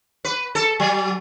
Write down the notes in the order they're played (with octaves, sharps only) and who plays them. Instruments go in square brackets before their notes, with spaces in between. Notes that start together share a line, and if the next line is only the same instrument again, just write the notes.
[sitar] B4
A4
F#3